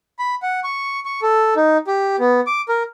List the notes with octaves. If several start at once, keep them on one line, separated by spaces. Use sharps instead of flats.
B5
F#5
C#6
C#6
A4
D#4
G4
B3
D6
A#4